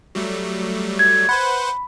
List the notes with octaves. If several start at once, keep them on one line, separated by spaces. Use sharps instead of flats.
F#3 G3 A3
G#6
B4 C5 F#5 B5